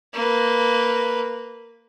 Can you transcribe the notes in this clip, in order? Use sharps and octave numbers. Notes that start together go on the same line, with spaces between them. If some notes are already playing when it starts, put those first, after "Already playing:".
A#3 B4